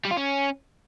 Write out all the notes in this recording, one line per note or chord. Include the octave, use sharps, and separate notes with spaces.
G3
F4
C#4